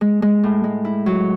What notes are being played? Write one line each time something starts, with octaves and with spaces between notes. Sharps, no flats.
G#3
G#3
A2
G#3
E4
F#3